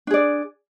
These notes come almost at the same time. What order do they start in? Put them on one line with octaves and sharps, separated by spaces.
D4 G#4 D5